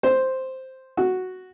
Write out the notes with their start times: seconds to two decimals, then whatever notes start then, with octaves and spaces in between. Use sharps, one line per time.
0.03 C5
0.97 F#4